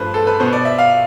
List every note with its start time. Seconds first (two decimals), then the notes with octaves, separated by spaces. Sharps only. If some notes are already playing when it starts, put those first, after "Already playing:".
Already playing: G2 F3 A3 B4 C5
0.14 A4
0.27 B4
0.40 B2 C5
0.43 B3
0.53 D5
0.65 E5
0.78 F5